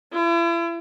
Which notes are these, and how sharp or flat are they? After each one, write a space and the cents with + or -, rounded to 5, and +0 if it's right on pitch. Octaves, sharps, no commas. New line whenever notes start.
E4 +40